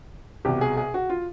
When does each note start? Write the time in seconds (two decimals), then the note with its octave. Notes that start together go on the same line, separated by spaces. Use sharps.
0.45 C2 B2 G4
0.61 G#4
0.77 G#4
0.94 F#4
1.10 F4